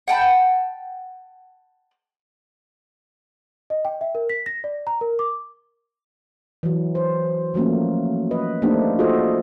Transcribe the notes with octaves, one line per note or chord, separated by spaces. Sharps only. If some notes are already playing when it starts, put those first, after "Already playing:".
F#5 G5 A5 B5
D#5
G5
E5
A#4
B6
A#6
D5
A#5
A#4
D6
E3 F#3
C5
F3 F#3 A3 A#3 C#4
B4 D#5
A3 A#3 C4 D4 D#4 G4
F4 F#4 G#4 A4 C5 D#5